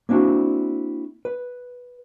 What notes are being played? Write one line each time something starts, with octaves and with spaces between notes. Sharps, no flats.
A#3 C4 D4 E4 F#4
B4